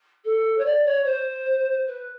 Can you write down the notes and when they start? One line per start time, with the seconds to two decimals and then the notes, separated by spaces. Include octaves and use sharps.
0.24 A4
0.58 C#5
0.65 D5
0.85 C#5
1.05 C5
1.87 B4